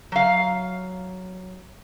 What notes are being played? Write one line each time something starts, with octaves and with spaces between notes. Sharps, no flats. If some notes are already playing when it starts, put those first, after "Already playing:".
F#3 F5